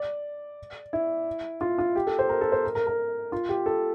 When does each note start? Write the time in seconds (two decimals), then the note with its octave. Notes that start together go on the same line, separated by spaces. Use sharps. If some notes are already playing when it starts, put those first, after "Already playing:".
Already playing: D5
0.93 E4
1.61 F4
1.79 F4
1.96 G4
2.07 A4
2.19 C5
2.29 A#4
2.41 A4
2.52 C5
2.64 A#4
2.75 A#4
2.87 A#4
3.32 F4
3.49 G4
3.66 A4